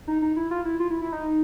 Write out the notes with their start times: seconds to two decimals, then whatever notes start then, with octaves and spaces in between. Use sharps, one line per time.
0.08 D#4
0.22 D#4
0.36 E4
0.51 F4
0.65 E4
0.80 F4
0.90 E4
1.01 E4
1.12 D#4